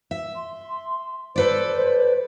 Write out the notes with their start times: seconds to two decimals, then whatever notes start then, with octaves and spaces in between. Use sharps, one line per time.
0.11 E5
0.36 C6
1.36 A4 B4 C5 D5